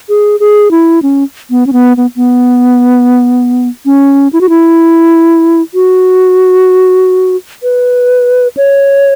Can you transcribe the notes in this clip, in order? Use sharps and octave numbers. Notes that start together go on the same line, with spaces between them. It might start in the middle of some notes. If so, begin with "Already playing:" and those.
G#4
G#4
E4
C#4
B3
C#4
B3
B3
B3
C#4
E4
F#4
E4
F#4
B4
C#5